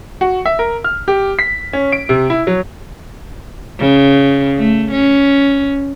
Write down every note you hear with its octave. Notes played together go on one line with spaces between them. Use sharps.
F#4
E5
A#4
F6
G4
B6
C#4
D7
C3
E4
F#3
C#3
A3
C#4